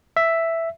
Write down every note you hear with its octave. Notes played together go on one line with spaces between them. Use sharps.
E5